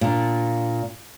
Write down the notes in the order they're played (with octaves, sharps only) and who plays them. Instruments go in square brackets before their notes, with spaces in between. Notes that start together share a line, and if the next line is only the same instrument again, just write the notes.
[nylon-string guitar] A#2 D4